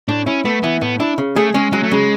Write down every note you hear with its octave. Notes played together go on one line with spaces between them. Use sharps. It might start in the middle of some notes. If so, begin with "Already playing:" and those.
A2 D4
C#4 E4
A3 B3
E3 B3
A2 B3
D4 E4
C#3
A3 G#4
G#3 C#4
F#3 G#3
A3
C#3 G#3